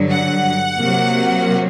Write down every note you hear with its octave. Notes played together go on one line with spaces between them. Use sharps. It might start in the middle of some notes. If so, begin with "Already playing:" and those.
Already playing: G2 D3 F#3
F#5
C3 F#3 A#3